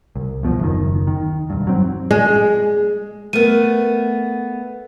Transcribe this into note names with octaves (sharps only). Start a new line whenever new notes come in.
C2
E2 B2 D3 F3
F#1 D#2 D#3
D#3
E1 G2
F#3 C4
G#3
A3 B3 A#4 D#7